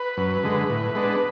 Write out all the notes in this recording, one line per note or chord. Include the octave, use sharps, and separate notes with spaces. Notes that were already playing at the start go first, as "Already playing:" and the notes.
Already playing: B4
F#2
D3 G#3
A2
G#3 B3 D4